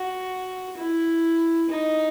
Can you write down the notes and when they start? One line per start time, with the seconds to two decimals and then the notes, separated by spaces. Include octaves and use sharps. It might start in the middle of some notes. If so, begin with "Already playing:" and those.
Already playing: F#4
0.77 E4
1.70 D#4